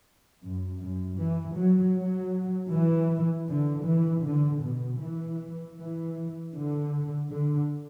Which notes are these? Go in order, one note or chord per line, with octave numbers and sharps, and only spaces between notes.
F#2
F#2
E3
F#3
F#3
E3
D3
E3
D3
B2
E3
E3
D3
D3